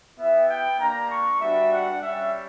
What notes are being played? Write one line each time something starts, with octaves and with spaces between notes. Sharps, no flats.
B3 E4 G4 E5
G5
A#3 D4 G4 A#5
C#6
G3 B3 D4 F#4 E5
F#5
G3 C#4 G4 E5